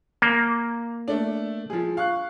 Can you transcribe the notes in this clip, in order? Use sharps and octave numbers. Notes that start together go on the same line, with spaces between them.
A#3
A3 D4
F3 G#4
F5 C#6 F#6